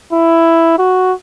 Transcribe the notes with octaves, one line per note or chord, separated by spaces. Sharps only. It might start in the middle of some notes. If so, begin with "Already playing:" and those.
E4
F#4